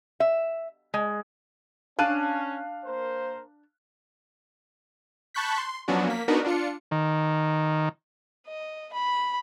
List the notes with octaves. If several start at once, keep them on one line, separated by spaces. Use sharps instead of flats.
E5
G#3
C#4 D4 F5 A5 F#6 D#7
A#3 A#4 C5
A5 B5 C#6 F#6 G6 B6
C6
F3 F#3 B3 C#4 D4 F#4
A#3 B6
B3 D4 D#4 F#4 A#4 B4
D4 F4 C#7
D#3
D#5
B5